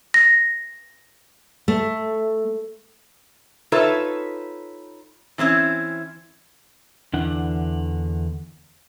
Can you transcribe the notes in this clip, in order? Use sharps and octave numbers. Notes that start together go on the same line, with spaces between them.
A#6
A3
D#4 F4 A4 B4 C#5 E5
E3 C4 C#4 E4
E2 D3 E3 D4 F#5